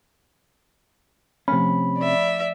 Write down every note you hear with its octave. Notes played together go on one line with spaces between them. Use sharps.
C3 F3 A3 C#4 B5 F6
D5 E5